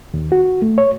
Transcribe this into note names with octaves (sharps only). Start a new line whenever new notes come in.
D#2
F#4
A3
C#5